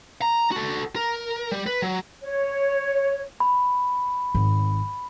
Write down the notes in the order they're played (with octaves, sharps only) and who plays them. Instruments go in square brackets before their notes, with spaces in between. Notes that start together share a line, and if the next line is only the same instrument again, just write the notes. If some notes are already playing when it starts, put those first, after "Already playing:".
[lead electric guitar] A#5
F#4 A4
A#4
G3
B4
F#3
[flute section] C#5
[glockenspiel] B5
[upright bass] G#1